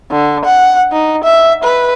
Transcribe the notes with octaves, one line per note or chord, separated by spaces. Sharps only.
D3
F#5
D#4
E5
B4